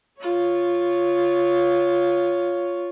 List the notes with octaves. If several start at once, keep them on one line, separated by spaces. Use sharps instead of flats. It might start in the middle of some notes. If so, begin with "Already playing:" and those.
F4 C#5